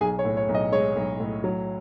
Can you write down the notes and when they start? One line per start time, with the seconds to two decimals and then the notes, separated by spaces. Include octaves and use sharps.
0.01 B1 G#4 G#5
0.19 C#5
0.25 A2
0.37 C#5
0.49 B1
0.54 D#5
0.72 G#3 C#5
0.96 B1
1.20 A2
1.44 F#3